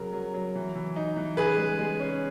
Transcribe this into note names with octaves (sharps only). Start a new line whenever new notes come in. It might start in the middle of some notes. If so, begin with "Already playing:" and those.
Already playing: C#3 F#3 A#4
F#3
F#3
E3
E3
D#4
E3
C#3 G#4 B4
G#3
G#3
C#4